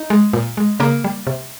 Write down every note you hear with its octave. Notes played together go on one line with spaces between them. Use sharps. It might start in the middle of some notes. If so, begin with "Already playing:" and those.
Already playing: D#4 D#5
G#3
A#2
G#3
C#3 A#3 A#4
G3
C3